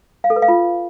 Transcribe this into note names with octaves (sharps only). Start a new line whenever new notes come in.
F5
A4
B4
F5
F4